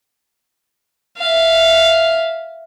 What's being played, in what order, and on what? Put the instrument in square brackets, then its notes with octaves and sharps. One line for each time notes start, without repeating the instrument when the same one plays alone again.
[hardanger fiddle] E5 F5